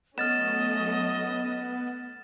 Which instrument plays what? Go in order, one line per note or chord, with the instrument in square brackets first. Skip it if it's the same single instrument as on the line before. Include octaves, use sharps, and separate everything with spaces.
[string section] F#3 A3 C#4 [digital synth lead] B3 [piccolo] D#5 [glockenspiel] F6 A6 E7